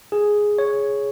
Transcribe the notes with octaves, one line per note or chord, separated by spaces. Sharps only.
G#4
C#5